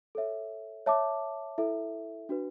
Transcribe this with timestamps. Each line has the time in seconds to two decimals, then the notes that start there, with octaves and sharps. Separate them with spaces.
0.15 A4 C#5 E5
0.86 C#5 E5 A5 D6
1.58 E4 A4 E5
2.29 D4 F#4 B4